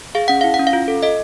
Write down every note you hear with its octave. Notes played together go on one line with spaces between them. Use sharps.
G#4 F5
C#4 F#5
E4 F5
F#5
C#4
F5
F4
A4
A4 D#5